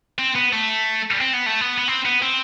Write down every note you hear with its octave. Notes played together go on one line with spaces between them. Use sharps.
C4
B3
A3
C4
B3
A3
B3
B3
C4
B3
C4